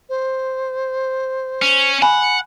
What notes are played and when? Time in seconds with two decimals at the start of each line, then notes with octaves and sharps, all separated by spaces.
0.09 C5
1.62 C#4
2.02 F#5 G#5 B5